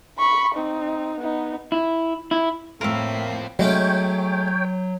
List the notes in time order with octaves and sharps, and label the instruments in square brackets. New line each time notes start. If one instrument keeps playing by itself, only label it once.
[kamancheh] B5 C#6
C4 D#4
B3 D#4
[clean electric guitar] E4
E4
[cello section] A2 [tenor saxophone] A#3 [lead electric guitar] C4 F4 [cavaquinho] A#4 E5
[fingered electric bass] F#3 [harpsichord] G#3 A3 C#4 [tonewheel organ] C#5 G5